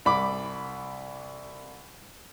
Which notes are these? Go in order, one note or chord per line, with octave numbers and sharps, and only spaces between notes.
C2 B5 D6